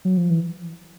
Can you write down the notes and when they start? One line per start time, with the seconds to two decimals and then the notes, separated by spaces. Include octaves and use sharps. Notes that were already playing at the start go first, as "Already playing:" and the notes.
0.05 F#3
0.17 F3
0.30 E3